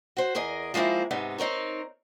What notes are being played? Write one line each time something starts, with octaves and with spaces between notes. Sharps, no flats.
F#4 C5
E2 G#4 A#4 D#5
F3 G#3 A#3 C4 E4
G#2 C3 B3 D#4
C4 D#4 A#4 C#5